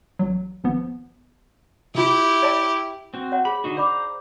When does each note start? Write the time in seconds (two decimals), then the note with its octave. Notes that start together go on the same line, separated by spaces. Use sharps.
0.19 A1 F#3
0.64 G#1 F3 B3
1.95 C3 E4 F4 G4
2.42 C#5 D5 A5
3.14 C4 F#4
3.32 C#5 F#5
3.45 G#4 B5
3.64 D3 D#4 F#4
3.77 C5 D5 A#5 B5 D6